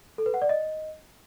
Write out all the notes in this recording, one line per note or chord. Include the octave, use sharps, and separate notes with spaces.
A4
B4
F#5
D5
D#5